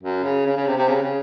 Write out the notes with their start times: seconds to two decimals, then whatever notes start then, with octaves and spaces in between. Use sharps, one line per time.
0.03 F#2
0.24 C#3
0.46 C#3
0.56 C#3
0.67 C3
0.78 C3
0.88 C#3
1.02 C#3